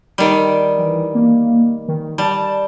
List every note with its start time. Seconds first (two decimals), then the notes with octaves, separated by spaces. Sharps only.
0.18 D#3 G3
0.79 E3
1.15 A#3
1.88 D#3
2.18 G3 A5